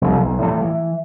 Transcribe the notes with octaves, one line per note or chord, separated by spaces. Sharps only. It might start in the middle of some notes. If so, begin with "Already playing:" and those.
F1 C2
B1
A2 E3 A3
E3